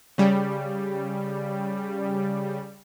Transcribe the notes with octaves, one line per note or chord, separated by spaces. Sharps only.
C#3 G3